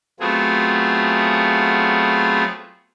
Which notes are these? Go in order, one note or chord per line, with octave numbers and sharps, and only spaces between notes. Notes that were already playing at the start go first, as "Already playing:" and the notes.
F#3 A3 B3 C4 F4 G#4